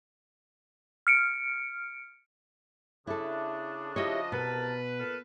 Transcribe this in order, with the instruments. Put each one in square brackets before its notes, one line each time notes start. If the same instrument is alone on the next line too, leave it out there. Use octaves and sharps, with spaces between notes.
[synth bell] F6 C#7 D7
[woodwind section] C#3 D4 [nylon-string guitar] E4 A4
[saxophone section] F3 D#5 [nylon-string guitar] E4 G4 C#5
[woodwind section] C2 A#4 A5 [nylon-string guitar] B2 [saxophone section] B4
[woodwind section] A#2 A4 F6